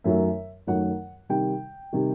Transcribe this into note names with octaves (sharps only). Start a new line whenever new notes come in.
F#2 D#3 F#3 A3 E5
F#2 D#3 F#3 A3 F#5
C3 D#3 G3 G5
C3 D#3 G3